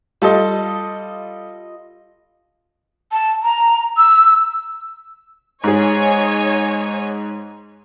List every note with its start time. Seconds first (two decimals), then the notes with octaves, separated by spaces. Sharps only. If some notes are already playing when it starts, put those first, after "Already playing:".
0.22 G3 F4 A4 D#5
3.12 A5
3.43 A#5
3.98 E6
5.64 G#2 G#4 C#5 D#5 G#5